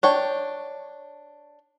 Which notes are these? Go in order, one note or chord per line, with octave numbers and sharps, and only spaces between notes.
D4 C#5 G5